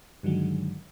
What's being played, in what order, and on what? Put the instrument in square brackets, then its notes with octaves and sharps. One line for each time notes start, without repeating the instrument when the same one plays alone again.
[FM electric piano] G2 D3 D#3 F#3 G#3